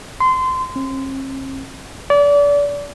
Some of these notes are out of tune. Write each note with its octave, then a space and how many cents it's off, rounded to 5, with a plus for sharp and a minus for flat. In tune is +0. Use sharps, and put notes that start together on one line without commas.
C6 -25
C4 +45
D5 -30